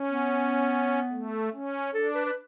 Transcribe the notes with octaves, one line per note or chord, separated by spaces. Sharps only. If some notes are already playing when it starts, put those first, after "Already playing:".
Already playing: C#4
B3
A3
C#4
D4 A4
B4
B4